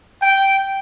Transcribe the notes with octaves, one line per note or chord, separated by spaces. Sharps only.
G5